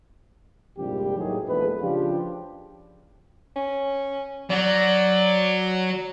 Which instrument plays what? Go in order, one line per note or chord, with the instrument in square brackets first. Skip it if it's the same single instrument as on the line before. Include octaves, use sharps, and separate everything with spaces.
[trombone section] A#1 F2 G#2 C3 G3 G4
D#2 A2 D#3 F#3 G#4
A#1 E2 G#3 A3 B4
C#3 F3 D4 F4 G4
[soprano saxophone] C#4
[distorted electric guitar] F#3 [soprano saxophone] D5